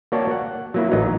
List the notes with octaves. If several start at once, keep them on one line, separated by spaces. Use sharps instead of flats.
A#3 F#4 C#5 D5 G5 A5
F#5
F#3 A#3 E4
A1 F#3 D#4 D#5 A#5